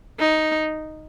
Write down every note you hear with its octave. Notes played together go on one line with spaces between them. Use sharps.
D#4